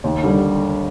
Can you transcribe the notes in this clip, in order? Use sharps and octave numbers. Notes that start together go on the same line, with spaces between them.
D#2
D3 G3